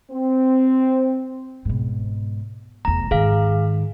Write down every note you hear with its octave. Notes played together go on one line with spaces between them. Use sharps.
C4
G#2 B2
F1 E2 A#5
G#2 D#3 G#4 F5